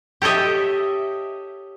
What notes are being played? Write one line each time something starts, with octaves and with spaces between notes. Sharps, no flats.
G4 A4 C#5 D#5 E5